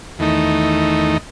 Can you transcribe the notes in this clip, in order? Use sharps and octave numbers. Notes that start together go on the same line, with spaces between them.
E2 D#3 A3 D#4